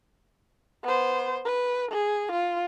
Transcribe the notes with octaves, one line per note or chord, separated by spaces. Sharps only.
B3 C5
B4
G#4
F4